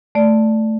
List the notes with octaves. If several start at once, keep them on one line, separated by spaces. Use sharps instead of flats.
A3 D5